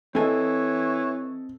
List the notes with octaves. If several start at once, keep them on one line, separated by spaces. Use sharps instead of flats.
E3 C4 A4 C#5 D#5 G#5